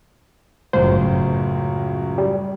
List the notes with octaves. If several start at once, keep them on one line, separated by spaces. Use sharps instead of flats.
G1 C#2 F#2 A2 C5
G3